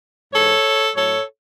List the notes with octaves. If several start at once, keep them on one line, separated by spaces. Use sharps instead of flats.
G#2 E3 A4 C#5
A2 F#3 A4 C#5